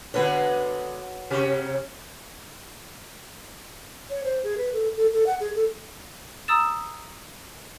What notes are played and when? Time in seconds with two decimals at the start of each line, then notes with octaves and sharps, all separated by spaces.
0.14 D3 G#3 B3 F#4 B4 C#5
1.30 C3 C#4 G4
4.10 C#5
4.24 C5
4.44 G#4
4.58 B4
4.73 A4
4.97 A4
5.13 A4
5.27 F#5
5.40 G#4
5.55 A4
6.48 A#5 D#6 E6 A6 E7